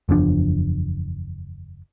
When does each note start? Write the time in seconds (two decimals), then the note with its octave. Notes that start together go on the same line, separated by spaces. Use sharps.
0.09 F#1 E2 F3 D4